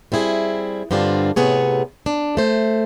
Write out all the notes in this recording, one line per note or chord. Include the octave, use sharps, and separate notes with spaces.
G3 C4 E4 G#4
G2 D3 C4 D4 F4
A2 C3 B3 G#4 C#5
D4
A3 C5